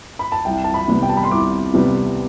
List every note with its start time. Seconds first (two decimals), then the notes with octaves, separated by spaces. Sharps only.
0.19 B5
0.32 A5
0.45 C2 G5
0.64 A5
0.74 B5
0.88 C3 G3 B3
1.03 G5
1.09 A5
1.17 B5
1.24 C6
1.31 C2 D6
1.74 C3 G3 B3